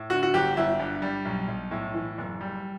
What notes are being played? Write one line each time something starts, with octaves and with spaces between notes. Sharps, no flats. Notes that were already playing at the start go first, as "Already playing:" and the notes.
Already playing: A2
D3 F#4
F#4
G1 G4
G1 E4
G2
G3
B1
B1
A2
E3
F#1
G3